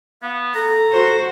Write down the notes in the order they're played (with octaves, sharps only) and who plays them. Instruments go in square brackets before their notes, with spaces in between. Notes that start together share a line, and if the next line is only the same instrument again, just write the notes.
[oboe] B3 [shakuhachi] F5
[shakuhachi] A4 [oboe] A#5
[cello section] F#4 [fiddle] C5